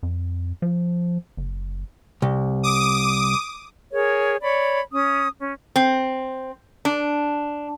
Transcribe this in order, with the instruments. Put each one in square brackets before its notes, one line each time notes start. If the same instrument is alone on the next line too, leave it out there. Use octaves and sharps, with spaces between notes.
[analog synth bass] F2
F3
F#1
[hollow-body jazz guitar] C2
[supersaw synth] D6 D#6
[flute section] G#4 A#4 C#5
C#5 D5 B5
C#4 D#6
C#4
[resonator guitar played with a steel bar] C4
D4